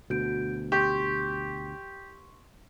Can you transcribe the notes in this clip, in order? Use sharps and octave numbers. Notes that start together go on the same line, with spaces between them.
D2 B2 F#4 G6 D7
G4 C6 C#6